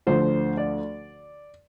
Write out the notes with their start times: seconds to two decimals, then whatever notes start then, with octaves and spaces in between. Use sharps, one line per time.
0.07 D2 D3 F3 C5
0.57 D5